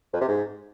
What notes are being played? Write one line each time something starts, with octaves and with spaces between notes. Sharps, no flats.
F2
C3
G#2